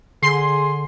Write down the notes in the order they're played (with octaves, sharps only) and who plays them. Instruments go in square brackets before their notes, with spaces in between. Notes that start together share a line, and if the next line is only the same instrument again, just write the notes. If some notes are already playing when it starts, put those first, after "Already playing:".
[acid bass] D3 [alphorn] G#4 [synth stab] C6